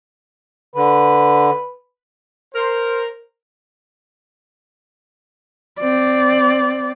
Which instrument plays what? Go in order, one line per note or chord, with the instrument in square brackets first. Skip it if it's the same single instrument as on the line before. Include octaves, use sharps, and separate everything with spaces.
[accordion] D3 [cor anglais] B4
[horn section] A#4 C5
[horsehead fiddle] C4 D5